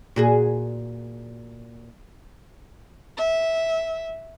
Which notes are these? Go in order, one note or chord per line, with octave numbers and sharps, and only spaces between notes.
A#2 F#4 G#4
E5